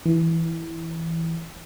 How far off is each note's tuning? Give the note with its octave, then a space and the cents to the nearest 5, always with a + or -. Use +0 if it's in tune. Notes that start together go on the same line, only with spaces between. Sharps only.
E3 -5